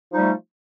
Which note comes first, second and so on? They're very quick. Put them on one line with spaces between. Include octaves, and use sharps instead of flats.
F3 D#4 G3 A3